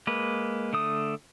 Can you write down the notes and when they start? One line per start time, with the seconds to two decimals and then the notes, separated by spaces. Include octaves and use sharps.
0.07 G#3 A#3 B4
0.73 D3 A3 D#6